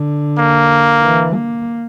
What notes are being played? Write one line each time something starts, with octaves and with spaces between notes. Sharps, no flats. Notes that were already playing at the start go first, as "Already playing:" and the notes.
Already playing: D3
A#3
E3
A#3